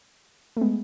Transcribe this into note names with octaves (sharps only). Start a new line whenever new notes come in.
A3
G#3 B3